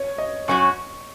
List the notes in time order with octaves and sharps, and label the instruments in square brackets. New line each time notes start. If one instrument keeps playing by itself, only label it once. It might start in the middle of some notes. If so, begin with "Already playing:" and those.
Already playing: [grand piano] C#5
D#5
[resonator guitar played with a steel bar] F#2 F#3 C#4 F#4 [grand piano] C#6